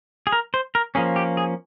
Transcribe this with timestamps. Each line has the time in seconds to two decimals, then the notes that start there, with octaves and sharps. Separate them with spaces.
0.27 G#4
0.32 A#4
0.54 C5
0.75 A#4
0.95 F3 A#3 C#4 G#4
1.16 G4
1.37 G#4